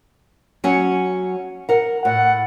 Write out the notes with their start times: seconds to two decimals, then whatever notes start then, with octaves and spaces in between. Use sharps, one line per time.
0.64 F#3 C#4 F#5
1.69 A#4 F#5
2.05 A2 F#5